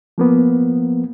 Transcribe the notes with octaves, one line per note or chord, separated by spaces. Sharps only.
F3 A#3 B3